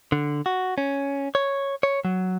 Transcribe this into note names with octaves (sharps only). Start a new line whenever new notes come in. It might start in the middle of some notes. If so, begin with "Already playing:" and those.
D3
F#4
C#4
C#5
C#5
F#3